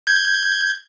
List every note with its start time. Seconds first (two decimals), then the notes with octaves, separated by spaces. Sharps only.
0.07 G6 G#6